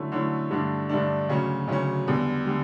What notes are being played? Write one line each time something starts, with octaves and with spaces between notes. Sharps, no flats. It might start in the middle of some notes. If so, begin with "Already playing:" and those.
Already playing: D3 F#3 A3 C#4 E4
D3 F#3 A3 C#4 E4
G2 D3 A3 D4
G2 D3 A3 D4
D2 C#3 F#3 C#4
D2 C#3 F#3 C#4
E2 D3 G3
D3 G3